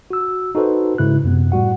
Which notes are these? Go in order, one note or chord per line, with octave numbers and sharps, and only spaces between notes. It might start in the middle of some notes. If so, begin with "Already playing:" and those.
F#4 E6
D#4 F#4 A4 B4 C5
G#2 C#3 E4 F#6
F#2 C3 B3
A2 G3 F#4 F#5